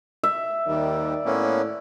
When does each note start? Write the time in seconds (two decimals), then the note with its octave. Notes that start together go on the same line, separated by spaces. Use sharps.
0.23 E5
0.67 D#2 D#3 G3 D5
1.25 A2 A#3 B3 C#4